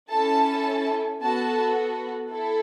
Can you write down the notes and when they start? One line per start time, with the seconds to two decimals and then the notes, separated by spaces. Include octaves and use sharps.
0.10 C#4 E4 A4 A5
1.21 B3 F#4 A4 A5
2.30 E4 A4